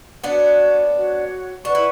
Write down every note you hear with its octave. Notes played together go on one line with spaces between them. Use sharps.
B3 D4 F#4 C#5 F#5
F#4 C#5 F#5
D4 B4 F#5 C#6
E4